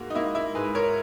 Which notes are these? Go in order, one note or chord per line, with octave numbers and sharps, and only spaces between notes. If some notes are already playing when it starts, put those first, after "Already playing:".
Already playing: G#2 A#3 F#4
D#4
A#3 E4
E4
G#2 G#4 B4
A#4 C#5